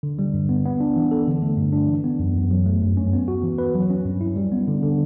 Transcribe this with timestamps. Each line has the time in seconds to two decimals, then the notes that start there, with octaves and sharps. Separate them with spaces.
0.03 D3
0.19 G3
0.34 G2
0.49 B3
0.65 B3
0.80 D4
0.96 E3
1.11 A4
1.27 D3
1.42 A3
1.58 G2
1.73 D4
1.89 E3
2.04 B3
2.20 F#2
2.35 F#2
2.51 F#3
2.66 A3
2.82 G2
2.97 C#4
3.13 B3
3.28 F#4
3.44 E3
3.58 B4
3.75 F#3
3.90 C#4
4.05 G2
4.21 E4
4.36 G3
4.52 B3
4.68 D3
4.83 D3